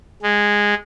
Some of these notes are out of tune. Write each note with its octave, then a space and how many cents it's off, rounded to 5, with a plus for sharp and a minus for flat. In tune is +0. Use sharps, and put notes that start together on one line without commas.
G#3 -10